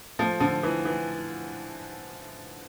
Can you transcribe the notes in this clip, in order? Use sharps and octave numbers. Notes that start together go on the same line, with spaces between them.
F3 A3
D3 F3
E3
E3